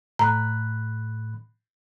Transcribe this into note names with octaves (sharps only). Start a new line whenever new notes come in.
A2 A#5 B5 F#6